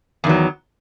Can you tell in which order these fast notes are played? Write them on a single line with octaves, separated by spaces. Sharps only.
E2 D#3 F#3